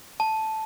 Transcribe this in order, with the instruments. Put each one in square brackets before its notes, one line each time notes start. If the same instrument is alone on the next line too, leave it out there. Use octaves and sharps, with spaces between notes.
[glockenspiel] A5